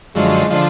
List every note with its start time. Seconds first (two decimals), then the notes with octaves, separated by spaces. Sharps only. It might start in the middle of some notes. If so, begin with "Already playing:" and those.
0.15 F#2 D3 F3 G#3
0.50 D3 F3